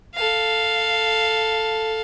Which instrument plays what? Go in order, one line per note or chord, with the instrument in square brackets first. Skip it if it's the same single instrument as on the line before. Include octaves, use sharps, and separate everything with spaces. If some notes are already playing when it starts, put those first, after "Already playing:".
[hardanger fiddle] A4 F5